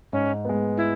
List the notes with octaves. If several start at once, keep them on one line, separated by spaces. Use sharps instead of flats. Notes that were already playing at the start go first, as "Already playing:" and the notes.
G#2 C#4
G#3 B3
E4